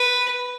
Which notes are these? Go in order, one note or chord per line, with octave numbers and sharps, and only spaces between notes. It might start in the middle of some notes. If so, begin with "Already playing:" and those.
Already playing: B4